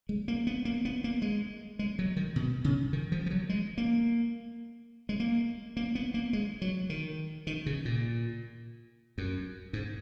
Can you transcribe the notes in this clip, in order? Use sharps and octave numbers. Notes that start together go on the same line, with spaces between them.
G#3
A#3
B3
A#3
B3
A#3
G#3
G#3
F#3
D#3
B2
C#3
D#3
F3
F3
F#3
G#3
A#3
G#3
A#3
A#3
B3
A#3
G#3
F#3
D#3
D#3
C#3
A#2
F#2
G#2